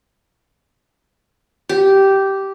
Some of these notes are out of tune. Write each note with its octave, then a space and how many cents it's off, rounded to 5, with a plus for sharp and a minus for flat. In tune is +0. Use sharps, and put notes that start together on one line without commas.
G4 -10